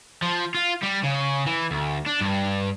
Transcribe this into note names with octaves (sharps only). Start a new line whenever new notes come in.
F3
F4
G3
C#3
E3
D2
D4
G2